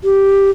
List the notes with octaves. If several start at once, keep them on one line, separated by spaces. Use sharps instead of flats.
G4